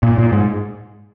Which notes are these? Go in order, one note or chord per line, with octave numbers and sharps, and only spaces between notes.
A#2
A#2
G#2